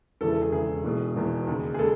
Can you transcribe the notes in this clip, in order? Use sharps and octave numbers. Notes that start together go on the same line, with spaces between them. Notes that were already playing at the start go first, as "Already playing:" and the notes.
E1 E2 C#3 E3 A4
A4
G#4
E1 E2 C#3 E3 G#4
E1 E2 B2
E1 E2 B2
D#2 C#3 G#3
G#4
C#3 G#3 A4